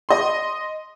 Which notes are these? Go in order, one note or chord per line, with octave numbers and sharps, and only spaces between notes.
D#5 C6